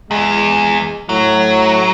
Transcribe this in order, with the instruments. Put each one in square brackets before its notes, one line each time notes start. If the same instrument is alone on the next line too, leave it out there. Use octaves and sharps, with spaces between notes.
[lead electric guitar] E2 [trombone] G#3
[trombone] A2 [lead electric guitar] F#3